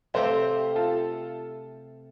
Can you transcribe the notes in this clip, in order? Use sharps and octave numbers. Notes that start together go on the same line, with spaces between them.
C3 A3 C4 G4 C5 F5
F4 A4